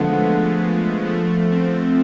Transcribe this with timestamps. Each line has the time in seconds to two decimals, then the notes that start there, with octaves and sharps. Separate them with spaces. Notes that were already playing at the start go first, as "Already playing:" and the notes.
Already playing: D3 F3 G#3 A3 B3
1.06 F3 A3
1.51 A3 C4